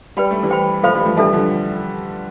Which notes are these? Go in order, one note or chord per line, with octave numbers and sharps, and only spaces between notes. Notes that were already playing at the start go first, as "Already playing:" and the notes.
G3 B4 D5 G5 B5
A3
E3 G3
C5 G5 B5
F3 A3 A4 C5 F5 B5
E3 G3
F3 A3
E3 G3 D4 A4 E5 A5
D3 F3